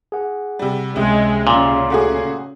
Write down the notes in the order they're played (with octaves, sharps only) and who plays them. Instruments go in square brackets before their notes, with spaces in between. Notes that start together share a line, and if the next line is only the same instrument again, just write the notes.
[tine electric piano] G#4 F#5
[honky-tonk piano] C3 G3
[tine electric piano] C#2 C#4 E5 [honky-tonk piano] C3 [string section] G#3
[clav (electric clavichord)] A#2 [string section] C#3
[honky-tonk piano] A3 F#4 G#4